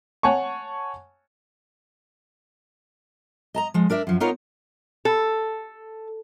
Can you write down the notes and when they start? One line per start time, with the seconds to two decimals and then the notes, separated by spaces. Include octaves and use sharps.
0.23 C#5 F#5 G#5 A5 C#6
3.54 D#5 A5 A#5
3.74 F3 G#3
3.90 D4 A#4 D5 E5
4.07 F#2 F3
4.20 B3 D#4 F4 A#4 C5 C#5
5.05 A4